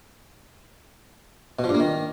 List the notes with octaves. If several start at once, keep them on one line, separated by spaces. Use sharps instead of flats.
B2
F3
G2
A#3
D#3